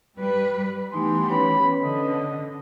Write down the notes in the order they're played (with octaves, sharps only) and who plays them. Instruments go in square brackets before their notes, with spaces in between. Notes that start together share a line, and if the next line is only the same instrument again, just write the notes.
[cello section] G3 B4
[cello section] E3 B3 G4 [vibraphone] A3 D#4 G#5 [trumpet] C6
[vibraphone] C#4 B4 C#5 [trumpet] B5
[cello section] D3 [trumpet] D#5